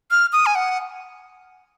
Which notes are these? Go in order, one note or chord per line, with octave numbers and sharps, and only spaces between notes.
F6
D#6
G#5
F#5